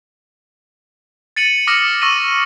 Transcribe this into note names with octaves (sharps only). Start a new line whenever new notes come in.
A6 C#7 D#7 F#7
D6 D#6 F6 A#6 C#7
C#6 E6 A#6 D#7